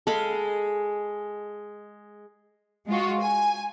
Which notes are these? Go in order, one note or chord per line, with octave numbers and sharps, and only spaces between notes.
G#3 A4 F5 B5
G#3 F4 F#4
G#5